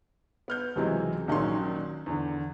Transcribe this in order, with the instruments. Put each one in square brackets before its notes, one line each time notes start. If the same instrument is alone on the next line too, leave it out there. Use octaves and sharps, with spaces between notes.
[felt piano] B3 F6 G6
C#2 C3 E3 F#3 G#3 C4
A#1 A#2 D#3 F#3 C#4 C6
E2 D3